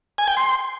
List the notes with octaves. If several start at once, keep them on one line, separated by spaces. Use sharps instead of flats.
G#5
G5
C6